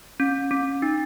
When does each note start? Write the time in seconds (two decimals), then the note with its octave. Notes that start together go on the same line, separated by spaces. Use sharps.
0.20 C#4
0.51 C#4
0.82 D#4